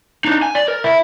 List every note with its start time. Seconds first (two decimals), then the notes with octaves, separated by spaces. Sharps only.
0.25 D4 D#4
0.42 G#5
0.55 D5
0.68 A#4
0.84 E4